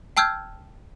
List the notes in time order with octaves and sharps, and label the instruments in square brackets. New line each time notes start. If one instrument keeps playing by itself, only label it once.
[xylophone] G5 A5 E6 F6 G6 G#6